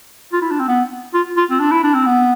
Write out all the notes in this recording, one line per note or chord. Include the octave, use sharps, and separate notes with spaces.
F4
E4
D4
C4
B3
F4
F4
C4
D4
E4
D4
C4
B3